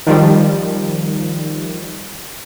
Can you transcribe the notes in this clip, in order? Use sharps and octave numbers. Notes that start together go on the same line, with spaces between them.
D#3 F3 G3